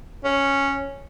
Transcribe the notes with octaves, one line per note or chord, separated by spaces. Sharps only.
C#4